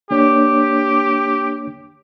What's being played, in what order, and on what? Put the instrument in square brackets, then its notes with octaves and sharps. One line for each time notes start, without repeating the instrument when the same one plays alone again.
[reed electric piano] A#3 D4 C#5 [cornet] G4